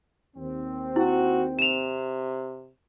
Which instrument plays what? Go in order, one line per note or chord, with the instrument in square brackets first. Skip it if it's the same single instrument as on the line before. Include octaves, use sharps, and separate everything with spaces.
[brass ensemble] D#2 C4
[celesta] E4 [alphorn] F#4
[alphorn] C3 [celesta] E7 F7